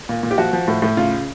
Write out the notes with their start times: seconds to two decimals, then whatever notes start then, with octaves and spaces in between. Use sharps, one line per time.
0.09 A#2
0.23 A#2
0.31 G4
0.38 F3 F#4
0.53 F3
0.68 A2
0.82 A2
0.97 C#3 F4